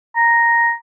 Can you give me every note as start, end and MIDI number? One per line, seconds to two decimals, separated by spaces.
0.16 0.72 82